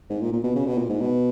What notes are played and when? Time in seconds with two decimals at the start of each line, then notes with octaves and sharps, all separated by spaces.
0.10 G#2
0.21 A#2
0.33 A#2
0.43 B2
0.55 C#3
0.67 B2
0.78 A#2
0.89 G#2
1.01 B2